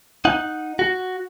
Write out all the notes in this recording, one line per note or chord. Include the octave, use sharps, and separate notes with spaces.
D#4 F#5
F#4